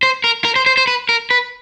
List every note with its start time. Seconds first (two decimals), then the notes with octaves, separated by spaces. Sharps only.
0.03 C5
0.24 A#4
0.45 A#4
0.56 C5
0.66 C5
0.77 C5
0.87 B4
1.09 A#4
1.30 B4